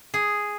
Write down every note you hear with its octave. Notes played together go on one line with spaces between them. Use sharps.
G#4